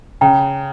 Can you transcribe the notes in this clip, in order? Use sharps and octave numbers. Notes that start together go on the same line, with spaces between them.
C#3 G5 A#5